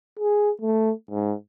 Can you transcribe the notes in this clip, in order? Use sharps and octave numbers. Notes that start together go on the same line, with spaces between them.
G#4
A3
G#2